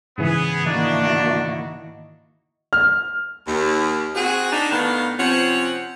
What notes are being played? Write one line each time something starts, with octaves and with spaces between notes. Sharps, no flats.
G#2 C#3 E3 B3 G#4
D#3 A#3 D4 E4 F#4
F6
D#2
C4 F#4 G#4
D4 D#4
A2 D#3 B3 D4 F5
C3 F3 C4 C#4 C#5 F#5